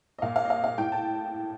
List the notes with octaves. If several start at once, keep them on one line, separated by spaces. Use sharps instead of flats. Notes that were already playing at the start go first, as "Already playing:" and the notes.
D#5
A#2 F5
F5
D#5
F5
F5
A2 G5
A5